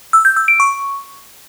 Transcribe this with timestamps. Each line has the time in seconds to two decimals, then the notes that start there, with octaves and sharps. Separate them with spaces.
0.13 E6
0.25 G6
0.37 E6
0.48 D7
0.60 C#6